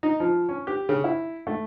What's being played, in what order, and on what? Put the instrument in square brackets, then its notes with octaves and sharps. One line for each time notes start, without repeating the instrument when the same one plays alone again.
[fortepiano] D#4
F3
C#4
G4
C#3
E4
A3